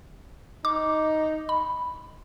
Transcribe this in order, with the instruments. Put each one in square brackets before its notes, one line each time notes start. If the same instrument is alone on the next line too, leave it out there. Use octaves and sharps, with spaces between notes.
[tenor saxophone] D#4 [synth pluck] D6
[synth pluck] B5